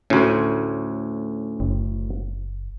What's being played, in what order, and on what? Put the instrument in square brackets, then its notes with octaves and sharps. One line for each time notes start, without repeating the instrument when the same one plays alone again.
[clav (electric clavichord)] D2 A2 [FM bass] C#4
[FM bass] F#1